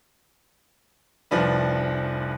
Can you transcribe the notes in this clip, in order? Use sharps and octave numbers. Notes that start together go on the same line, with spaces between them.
F1 C2 F3 D4 B4